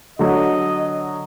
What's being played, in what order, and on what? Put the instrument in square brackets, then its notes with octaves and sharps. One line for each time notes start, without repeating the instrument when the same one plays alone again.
[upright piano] D3 F#3 [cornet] D#5